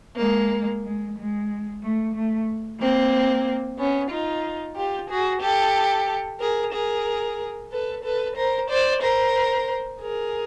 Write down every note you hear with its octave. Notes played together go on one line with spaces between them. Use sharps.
G#3 A#3
G#3
G#3
A3
A3
A#3 C4
B3 C#4
D#4 F4
F4 G4
F#4 G#4
G4 A4
G#4 A#4
G#4 A#4
A4 B4
A4 B4
A#4 C5
C5 D5
A#4 C5
G#4 A#4